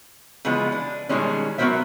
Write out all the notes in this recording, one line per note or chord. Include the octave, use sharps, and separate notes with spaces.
C#3 E3 F3 G#3 B3
D4
B2 D#3 E3 G3 G#3 C#4
F#3 B3 F#4 A#4 C5 E5